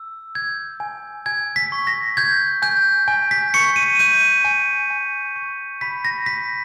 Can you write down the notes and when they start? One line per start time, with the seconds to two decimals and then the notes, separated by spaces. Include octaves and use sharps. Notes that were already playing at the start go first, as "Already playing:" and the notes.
Already playing: E6
0.35 G6 G#6
0.80 G#5
1.26 G#5 G#6
1.56 B6
1.72 C#6
1.87 A#6
2.17 G6 G#6
2.62 G#5 G6
3.08 G#5
3.31 B6
3.54 C#6 C#7
3.76 D#7
3.99 G6 D#7
4.45 G#5
4.90 G#5
5.36 C#6
5.81 B5 B6
6.05 A#6
6.26 G6 B6